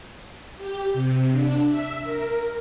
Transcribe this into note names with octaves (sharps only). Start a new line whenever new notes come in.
G4
C3
D4
E5
A#4